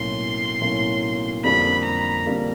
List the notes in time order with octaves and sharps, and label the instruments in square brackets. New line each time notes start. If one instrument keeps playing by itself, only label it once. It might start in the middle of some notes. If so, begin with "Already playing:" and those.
Already playing: [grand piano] B1 A2 F#3 A#3 C#4 [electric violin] C6
[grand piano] B1 A2 F#3 A#3 C#4
[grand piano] F2 D3 G3 A#3 [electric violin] B5
[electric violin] A#5
[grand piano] F2 D3 G3 A#3